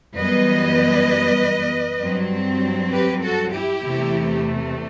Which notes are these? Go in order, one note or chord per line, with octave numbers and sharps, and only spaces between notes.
F#2 E3 G3 B3 B4 D#5
G2 F#3 C4
G4 B4
F#4 A4
E4 G4
E2 C3 E3 A3